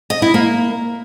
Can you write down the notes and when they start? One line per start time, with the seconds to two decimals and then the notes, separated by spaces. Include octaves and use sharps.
0.10 D#5
0.22 E4
0.34 A#3